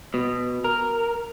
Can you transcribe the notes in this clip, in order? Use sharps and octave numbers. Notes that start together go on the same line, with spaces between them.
B2
A#4